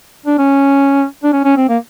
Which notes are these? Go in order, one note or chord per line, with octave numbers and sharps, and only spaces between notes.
D4
C#4
D4
C#4
C#4
C4
A#3